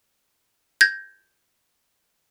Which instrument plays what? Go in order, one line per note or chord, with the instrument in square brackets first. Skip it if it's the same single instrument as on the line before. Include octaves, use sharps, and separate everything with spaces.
[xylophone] G6 G#6 A#6